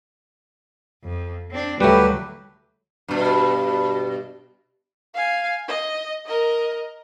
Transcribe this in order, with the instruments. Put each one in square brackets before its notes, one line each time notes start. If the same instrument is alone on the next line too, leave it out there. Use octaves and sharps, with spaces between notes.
[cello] F2
C4 D4
[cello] D2 F#3 [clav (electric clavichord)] G3 A3 [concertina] G4 B4
[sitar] G2 B2
[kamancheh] F5 G#5
D#5
A#4 D#5